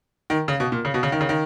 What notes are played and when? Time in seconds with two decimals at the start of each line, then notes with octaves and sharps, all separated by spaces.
0.30 D#3
0.48 C#3
0.60 B2
0.72 A#2
0.85 C#3
0.94 B2
1.03 C#3
1.12 D#3
1.21 C#3
1.29 D#3